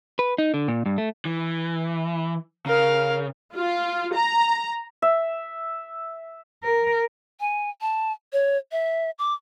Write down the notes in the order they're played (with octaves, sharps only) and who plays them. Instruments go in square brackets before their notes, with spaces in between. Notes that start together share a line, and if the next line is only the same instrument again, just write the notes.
[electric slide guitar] B4
D#4
D3
A#2
G2
A3
[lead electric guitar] E3
[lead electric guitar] C#3 [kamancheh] A#4 F5
[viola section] F4
A#5
[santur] E5
[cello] A#4
[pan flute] G#5
A5
C#5
E5
D6